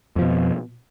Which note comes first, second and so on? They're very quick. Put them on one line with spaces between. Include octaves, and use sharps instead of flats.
F2 F3 B2